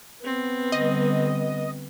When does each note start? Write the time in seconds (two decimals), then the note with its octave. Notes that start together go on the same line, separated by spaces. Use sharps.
0.24 B3 C4
0.72 D3 G3 D#5